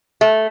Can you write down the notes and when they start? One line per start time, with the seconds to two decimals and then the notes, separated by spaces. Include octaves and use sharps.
0.21 A3